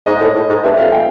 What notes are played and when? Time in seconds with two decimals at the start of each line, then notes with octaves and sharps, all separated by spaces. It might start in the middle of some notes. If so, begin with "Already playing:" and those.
0.06 G#2 D#5
0.20 A2
0.35 A2
0.49 G#2
0.63 G2 E5
0.78 F2 F5
0.92 G5